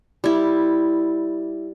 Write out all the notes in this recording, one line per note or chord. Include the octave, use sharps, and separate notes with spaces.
G3 E4